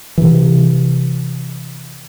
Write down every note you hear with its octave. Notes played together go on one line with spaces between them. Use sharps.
C3 E3